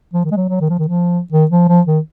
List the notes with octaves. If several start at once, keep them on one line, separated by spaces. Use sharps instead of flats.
F3
D#3
G#3
F#3
F#3
D#3
F3
D#3
F3
D#3
F3
F3
D#3